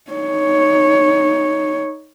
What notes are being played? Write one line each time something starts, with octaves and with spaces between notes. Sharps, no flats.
D#4 C#5